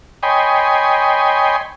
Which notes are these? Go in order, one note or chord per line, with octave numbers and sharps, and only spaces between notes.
C#5 D#5 G5 G#5 B5 C6